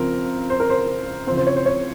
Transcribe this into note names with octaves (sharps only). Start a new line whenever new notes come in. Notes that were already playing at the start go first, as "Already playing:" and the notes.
Already playing: C#3 F3 C4 A#4
C5
A#4
C5
C#3 F3 C4 C5
C5
C#5
C5
C#5